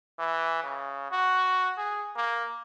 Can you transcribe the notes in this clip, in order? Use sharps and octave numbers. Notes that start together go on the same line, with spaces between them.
E3
C#3
F#4
G#4
A#3